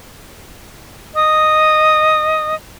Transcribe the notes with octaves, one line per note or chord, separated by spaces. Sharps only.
D#5 D#6